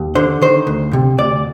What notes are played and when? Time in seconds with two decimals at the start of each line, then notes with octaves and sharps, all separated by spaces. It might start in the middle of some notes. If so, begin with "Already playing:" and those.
Already playing: D#2
0.15 D3 C5
0.42 D#3 C5
0.67 D2
0.93 C3
1.18 D2 D5